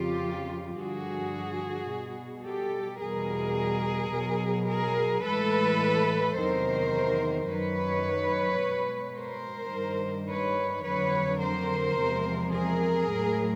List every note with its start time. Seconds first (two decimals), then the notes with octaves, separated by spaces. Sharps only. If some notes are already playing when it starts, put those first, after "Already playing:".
Already playing: F2 C#3 F3 F4 G4
0.76 G2 D3 F3 F#4 G#4
1.88 B2 G3
2.44 G4 A4
3.00 E2 B2 G3 G#4 A#4
4.13 B2 F#3
4.69 G#4 A#4
5.24 A2 E3 G#3 A4 B4
6.37 E2 C3 D#3 F#3 A#4 C5
7.49 F#2 D#3 F#3 B4 C#5
8.61 B2 G#3
9.16 A#4 C5
9.73 G2 D#3 G3
10.29 B4 C#5
10.84 F2 D3 F#3 B4 C#5
11.40 A#4 C5
11.96 E2 C3 F3 G#3
12.53 G#4 A#4
13.09 A2 F#3